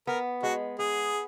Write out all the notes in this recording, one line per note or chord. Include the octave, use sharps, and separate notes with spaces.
B3 A#4
G#3 F#4
B3 G#4